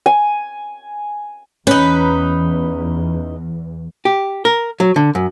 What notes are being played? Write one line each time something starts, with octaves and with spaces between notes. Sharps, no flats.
G#5
E2 C#4 D#4 B4
G4
A#4
F#3
D3
F#2